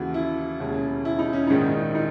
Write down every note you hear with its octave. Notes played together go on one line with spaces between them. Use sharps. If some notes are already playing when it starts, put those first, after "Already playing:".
Already playing: D#2 C#3 E3 F#4
E4
E1 D#2 C#3 G#3
E4
D#4
C#4
A#1 G#2 D#3 G#3 D#4
D#4